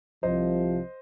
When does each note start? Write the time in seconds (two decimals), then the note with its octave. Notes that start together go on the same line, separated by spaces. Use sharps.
0.23 C2 C3 F3 C5 D#5